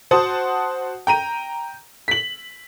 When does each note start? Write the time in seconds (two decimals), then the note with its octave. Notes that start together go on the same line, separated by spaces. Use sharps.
0.11 F#4 C5 F#5 A5 D#6
1.07 G5 A#5 D#7
2.08 B6 F#7